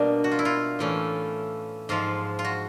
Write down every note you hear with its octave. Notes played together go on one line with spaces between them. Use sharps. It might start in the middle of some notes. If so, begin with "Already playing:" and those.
Already playing: B2 G3 A#3 D4
F#4
F4
E4
F4
A2 E3 A3 C#4
G#2 F3 G#3 F4
F4
F#4